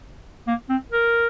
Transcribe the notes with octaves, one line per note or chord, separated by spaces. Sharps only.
A#3
C4
A#4